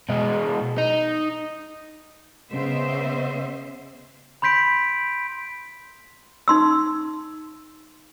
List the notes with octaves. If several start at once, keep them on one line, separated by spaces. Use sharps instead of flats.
B2 G#3
D#4
C#3 B3 C5 D#5 E5
B5 C6 G6 B6 D7
D#4 C6 E6